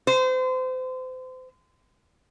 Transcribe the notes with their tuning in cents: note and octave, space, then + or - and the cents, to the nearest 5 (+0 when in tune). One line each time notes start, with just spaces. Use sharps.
C5 -35